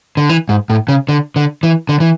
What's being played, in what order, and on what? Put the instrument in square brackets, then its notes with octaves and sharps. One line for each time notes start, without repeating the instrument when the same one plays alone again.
[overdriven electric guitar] D3
E3
G#2
A2
C#3
D3
D3
E3
D3
E3